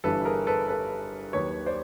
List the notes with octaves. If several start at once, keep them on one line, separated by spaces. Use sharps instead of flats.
G1 G2 E3 A4 B4
G#4 A#4
A4 B4
A4 B4
D#2 D#3 F#3 B4 C#5
C5 D5